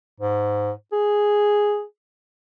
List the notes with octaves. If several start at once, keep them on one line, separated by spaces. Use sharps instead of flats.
G#2
G#4